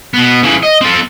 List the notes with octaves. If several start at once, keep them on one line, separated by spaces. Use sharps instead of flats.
B2 B3
C#3 E3
D#5
C4 A4